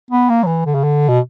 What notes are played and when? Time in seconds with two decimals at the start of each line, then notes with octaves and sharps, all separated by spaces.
0.11 B3
0.30 A#3
0.43 F#3
0.47 E3
0.66 D3
0.75 C#3
0.84 D3
1.08 B2